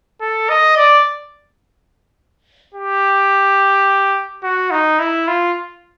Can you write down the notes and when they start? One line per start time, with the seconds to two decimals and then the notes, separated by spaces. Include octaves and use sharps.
0.21 A4
0.50 D#5
0.77 D5
2.75 G4
4.43 F#4
4.71 D#4
4.99 E4
5.28 F4